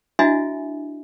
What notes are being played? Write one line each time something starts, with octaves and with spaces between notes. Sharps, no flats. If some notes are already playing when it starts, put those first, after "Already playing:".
D4 E4 F#4 D#5 E5 G#5